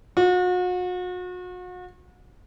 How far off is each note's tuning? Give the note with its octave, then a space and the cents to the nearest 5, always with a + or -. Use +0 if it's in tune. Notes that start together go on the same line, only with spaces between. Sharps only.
F#4 -40